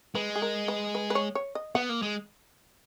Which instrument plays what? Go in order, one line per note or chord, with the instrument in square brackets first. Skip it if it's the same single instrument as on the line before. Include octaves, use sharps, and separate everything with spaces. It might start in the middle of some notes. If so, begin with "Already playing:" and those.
[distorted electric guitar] G#3 [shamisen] B4
[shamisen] G#4
A#4
B4
B4
B4
C#5
C#5
D#5
[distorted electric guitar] B3 [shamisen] F#5
[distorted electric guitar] A#3
G#3